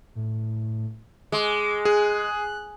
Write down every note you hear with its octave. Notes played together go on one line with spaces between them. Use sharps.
A2
G#3 D6
G#4 F#6